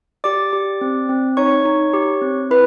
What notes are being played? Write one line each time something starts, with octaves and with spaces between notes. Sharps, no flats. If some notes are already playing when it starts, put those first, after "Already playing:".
G4 D5 D6
G4
C4
C4
D#4 C#5 C#6
D#4
G4
C4
E4 B4 B5